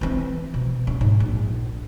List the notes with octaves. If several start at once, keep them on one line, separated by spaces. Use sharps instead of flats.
E3 C4
B2
C#4
G#2
A#1